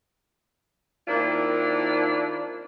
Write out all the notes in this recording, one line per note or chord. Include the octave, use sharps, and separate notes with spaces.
D#3 A#3 C4 D4 E4 F4